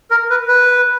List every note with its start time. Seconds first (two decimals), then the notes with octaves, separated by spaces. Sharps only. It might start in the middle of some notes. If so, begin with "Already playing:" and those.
0.10 A#4
0.30 B4
0.48 B4